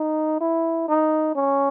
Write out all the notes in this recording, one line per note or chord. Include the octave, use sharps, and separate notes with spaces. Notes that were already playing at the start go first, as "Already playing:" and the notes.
Already playing: D#4
E4
D#4
C#4